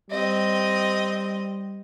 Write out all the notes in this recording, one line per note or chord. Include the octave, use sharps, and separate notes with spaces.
G3 C4 D#5